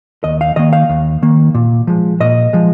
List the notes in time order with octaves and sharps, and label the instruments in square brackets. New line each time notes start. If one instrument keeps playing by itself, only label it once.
[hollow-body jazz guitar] D#2 D#5
F5
D#3 A#3 D#5
F5
D#2
D#3 A#3
A#2
F3 G#3
A#2 D#5
F3 G#3